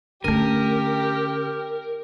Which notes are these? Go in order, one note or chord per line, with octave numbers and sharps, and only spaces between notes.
D3 A3 C#4 G4 A#4 D#7